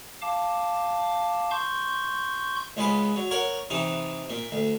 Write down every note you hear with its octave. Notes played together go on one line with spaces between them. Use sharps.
F5 A5 D6
C6 C#6 G6
C#2 G#3 B3 B4
F#3
A#4 C#5 F#5
C3 E3 D#4
A#2
D2